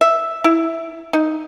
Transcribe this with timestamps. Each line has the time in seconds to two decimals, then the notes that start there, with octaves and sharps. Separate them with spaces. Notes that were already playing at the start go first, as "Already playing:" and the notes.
0.01 E5
0.44 E4
1.13 D#4